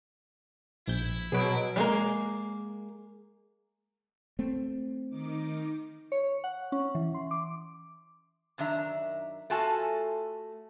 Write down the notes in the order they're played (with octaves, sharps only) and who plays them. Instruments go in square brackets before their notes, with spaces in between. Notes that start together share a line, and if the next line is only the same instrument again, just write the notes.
[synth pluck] A#1 G6 [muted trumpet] E4
[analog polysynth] B2 F#3 D7 [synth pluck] G#4 B4
[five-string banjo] G3 G#3 A#3
[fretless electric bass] A3 C4
[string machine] D#3 D#4 D6
[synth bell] C#5
F#5
C#4
E3
C6
D6
[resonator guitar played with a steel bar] F#2 D#3 D4 E5 A#5
A3 F4 F#4 A4 G#5 A5